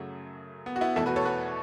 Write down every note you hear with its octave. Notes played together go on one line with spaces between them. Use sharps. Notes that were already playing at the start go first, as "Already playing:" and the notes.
Already playing: F#2 C#3 F#3 A3
B3
F#4
B3 E4
E2 B2 A3 E4 A4
F#4 B4
A4 C#5
F#4 B4